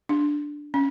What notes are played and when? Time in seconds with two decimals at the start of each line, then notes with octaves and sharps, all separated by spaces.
0.09 D4
0.74 C#4